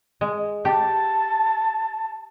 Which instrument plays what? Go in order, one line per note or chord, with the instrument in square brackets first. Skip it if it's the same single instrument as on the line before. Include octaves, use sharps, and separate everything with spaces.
[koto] G#3
[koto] G4 [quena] A5